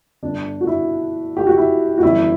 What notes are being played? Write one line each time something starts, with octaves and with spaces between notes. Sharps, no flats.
G1 G2 D3 D4
F#4
E4
G4
F#4
E4
F#4
G1 F#2 E3 E4